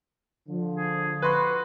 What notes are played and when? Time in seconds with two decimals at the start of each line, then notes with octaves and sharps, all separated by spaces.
0.48 D3 F3
0.77 G#4
1.22 F#4 B4 C6